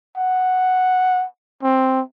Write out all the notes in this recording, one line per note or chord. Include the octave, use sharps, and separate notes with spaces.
F#5
C4